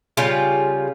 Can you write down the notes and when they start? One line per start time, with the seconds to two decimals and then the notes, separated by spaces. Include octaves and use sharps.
0.17 C#3 G3 F4